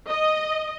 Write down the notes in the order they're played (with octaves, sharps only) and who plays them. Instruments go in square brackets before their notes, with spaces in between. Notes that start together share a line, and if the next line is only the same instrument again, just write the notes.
[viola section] D#5